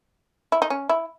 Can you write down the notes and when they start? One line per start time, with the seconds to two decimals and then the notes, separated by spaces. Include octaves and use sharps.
0.52 E4
0.62 D#4
0.70 C#4
0.89 E4